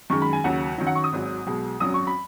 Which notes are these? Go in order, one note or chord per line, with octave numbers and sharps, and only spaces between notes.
F#2 D#3 G#3 C#6
B5
G#5
D#2 C#3 F#3 F#5
F#2 D#3 F#3
F#5
C#6
D#6
G#1 G#2 F#3
B1 B2 G#3
G#1 F#2 F#3 D#6
C#6
B5